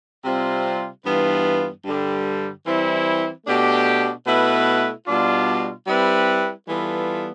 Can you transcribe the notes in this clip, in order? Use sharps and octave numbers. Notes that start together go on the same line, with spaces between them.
C3 G3 C4 F4
G2 E3 B3 F4 B4
G2 D3 G3
E3 G3 C4 E4
B2 A3 D4 G4
B2 A3 E4 B4
B2 G3 D4 F4
G3 C4 E4 B4
E3 G3 B3 F4 A4